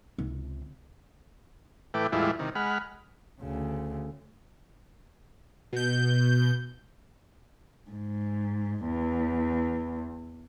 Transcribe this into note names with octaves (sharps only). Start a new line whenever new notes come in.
C#2 C3
A2 E3 A3 B4 G5 D6
E2 A2 G3 G#3 E4 F4
C3 D#3
G#3 F#5 B5 F6
D2 C#3
B2 G6
G#2
E2